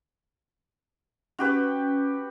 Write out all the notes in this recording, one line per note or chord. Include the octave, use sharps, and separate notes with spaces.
C#4 F#4 G4 B4